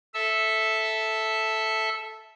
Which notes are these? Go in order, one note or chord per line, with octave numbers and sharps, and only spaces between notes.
A4 E5 A5 E6